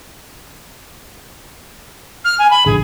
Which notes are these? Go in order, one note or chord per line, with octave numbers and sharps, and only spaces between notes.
F6
G#5
B5
A#1 D3 G#4